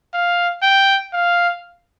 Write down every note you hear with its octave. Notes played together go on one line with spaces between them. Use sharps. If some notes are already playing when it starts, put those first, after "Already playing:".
F5
G5
F5